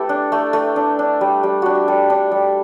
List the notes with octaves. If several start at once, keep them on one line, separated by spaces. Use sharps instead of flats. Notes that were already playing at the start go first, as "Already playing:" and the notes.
Already playing: A3 E4 G4 A4 B4
D4
A3
A3
D4
D4
G3
G3
D4 F#4
G4
G3 A4
D4
G3